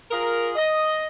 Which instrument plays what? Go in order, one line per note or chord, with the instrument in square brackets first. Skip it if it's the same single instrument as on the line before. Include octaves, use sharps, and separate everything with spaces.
[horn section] F4 G#4 A#4
D#5